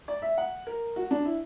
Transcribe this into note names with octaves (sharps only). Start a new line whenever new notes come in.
D5
E5
F#5
A#4
F#4
D4
E4